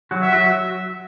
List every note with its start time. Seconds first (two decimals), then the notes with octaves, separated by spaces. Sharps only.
0.11 F#3 F#4
0.22 E5
0.32 F#3 F#4